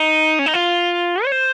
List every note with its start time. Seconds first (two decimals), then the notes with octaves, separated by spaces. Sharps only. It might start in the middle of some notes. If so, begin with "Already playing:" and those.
Already playing: D#4
0.39 C#4
0.46 D#4
0.54 F4
1.24 C#5
1.32 C5